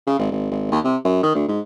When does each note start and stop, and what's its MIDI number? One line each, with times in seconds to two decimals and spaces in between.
0.07 0.17 49
0.19 0.29 32
0.32 0.48 32
0.51 0.71 32
0.72 0.79 39
0.84 0.96 48
1.05 1.23 42
1.23 1.31 51
1.35 1.46 38
1.48 1.60 44